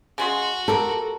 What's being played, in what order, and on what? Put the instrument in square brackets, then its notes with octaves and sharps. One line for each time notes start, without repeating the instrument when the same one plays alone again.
[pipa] C#3 G#3 C6 [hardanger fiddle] F#4
[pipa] F3 G3 A#4 [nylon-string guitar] A4